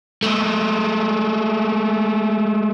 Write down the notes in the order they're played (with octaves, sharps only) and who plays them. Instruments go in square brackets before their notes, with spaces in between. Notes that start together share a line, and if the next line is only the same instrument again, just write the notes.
[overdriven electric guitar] G#3 A3